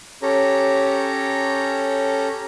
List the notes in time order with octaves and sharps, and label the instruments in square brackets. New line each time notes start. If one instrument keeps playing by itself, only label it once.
[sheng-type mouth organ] C#4 G4 A4 C#5 A#5